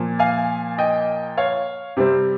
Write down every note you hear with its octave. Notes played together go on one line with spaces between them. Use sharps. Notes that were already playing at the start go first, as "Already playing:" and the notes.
Already playing: A#2 F3 A#3
F5 G#5
D#5 G5
C#5 F5
C3 G3 C4